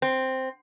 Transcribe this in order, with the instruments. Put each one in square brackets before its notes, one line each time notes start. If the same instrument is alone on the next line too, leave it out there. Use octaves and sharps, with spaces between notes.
[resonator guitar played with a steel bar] C4